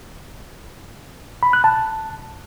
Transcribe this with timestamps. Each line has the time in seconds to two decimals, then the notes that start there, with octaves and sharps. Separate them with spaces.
1.43 B5
1.53 F#6
1.64 A5